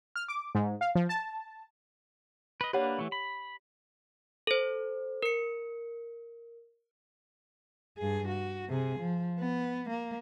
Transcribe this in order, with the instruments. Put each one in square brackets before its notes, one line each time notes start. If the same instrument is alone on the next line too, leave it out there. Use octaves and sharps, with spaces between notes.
[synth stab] F6
D6
G#2
F5
F3
A5
[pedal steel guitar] B4 D#5
[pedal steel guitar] A#3 D4 B4 [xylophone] G4 C#5 F#5
[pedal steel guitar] E3 A3
B5
[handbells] A4 C5
A#4 C#7
[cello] G2 G#4
F#4
C3 G#4
F3
B3
A#3